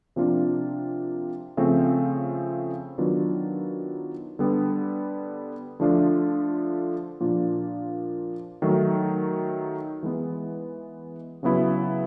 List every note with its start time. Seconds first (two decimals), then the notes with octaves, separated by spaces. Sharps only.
0.16 C3 F3 A#3 D4 F4
1.57 C#3 F3 A3 C4
2.98 D#3 F#3 B3 D4 F4
4.39 D3 G3 B3
5.80 D3 F3 A3 D4 F4
7.20 A#2 F3 A#3 D4 F4
8.62 D#3 F#3 A3
10.03 E3 G#3 B3
11.43 C#3 F#3 B3 E4